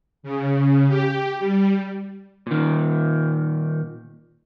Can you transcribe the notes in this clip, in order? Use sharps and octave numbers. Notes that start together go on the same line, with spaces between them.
C#3
G4
G3
A#2 D#3